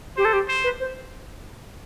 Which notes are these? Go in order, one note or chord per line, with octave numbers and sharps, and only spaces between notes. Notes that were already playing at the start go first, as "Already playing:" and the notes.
G4 C5
A4
G4
C5
B4
C5